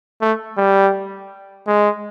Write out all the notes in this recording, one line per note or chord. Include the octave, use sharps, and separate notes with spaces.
A3
G3
G#3